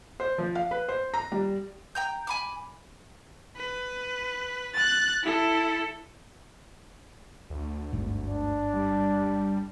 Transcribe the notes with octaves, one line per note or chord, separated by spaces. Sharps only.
C5
F3
F5
B4
C5
A#5
G3
G5 A#5 G6
G#5 B5 D6
B4
F#6 A6
E4 A4
D2
G1 G#2
D4
G3